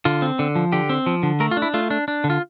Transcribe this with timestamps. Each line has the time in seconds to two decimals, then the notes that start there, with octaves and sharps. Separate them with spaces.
0.05 D3 F4
0.22 C4
0.39 D3
0.55 F3
0.72 D3 G4
0.89 C4
1.06 F3
1.23 D3
1.40 A3 A#4
1.51 F4
1.57 D4
1.62 E4
1.74 A3 F4
1.90 D4
2.08 D4
2.24 D3
2.30 F4